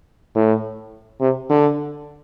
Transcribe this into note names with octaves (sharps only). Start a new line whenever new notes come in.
A2
C3
D3